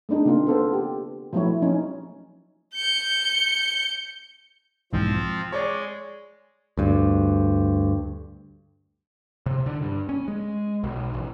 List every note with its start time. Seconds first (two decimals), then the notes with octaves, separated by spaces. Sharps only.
0.09 A3 C4 D4 D#4 G#4
0.25 C#3 A#3 C4 F4
0.47 B3 A4 C5
0.73 G4
1.33 F3 F#3 A3 B3 E4 C#5
1.62 F3 A#3 C#4 D#4
2.75 G6 C#7
4.93 B1 E2 G#2 F3 C4
5.52 G#3 C#5 D5
6.77 D2 G2
9.46 C3
9.66 D3
9.82 G2
10.09 C#4
10.28 G#3
10.84 B1
11.14 A1